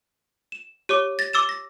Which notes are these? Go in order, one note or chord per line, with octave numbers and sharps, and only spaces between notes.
E7
G4 C#5 D6
A6 A#6
D6 E6 A6 E7
A#6